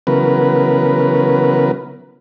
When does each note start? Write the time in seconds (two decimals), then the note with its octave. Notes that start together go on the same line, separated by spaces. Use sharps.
0.07 C#3 E3 F#3 B3 A#4 B4